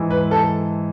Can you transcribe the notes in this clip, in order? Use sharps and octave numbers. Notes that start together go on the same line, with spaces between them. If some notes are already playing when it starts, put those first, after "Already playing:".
Already playing: G#2 E3
B4
A4